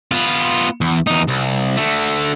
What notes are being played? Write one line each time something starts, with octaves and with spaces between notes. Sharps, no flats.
B3 F4
E2
E2 D#4
C2
D3 A3